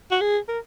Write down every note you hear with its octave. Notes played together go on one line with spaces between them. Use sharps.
F#4
G#4
A#4